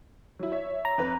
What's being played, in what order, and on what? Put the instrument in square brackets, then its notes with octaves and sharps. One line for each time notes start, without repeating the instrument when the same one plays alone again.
[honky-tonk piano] F#3 E4
C#5 E5
[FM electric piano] A#5
[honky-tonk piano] F2 B4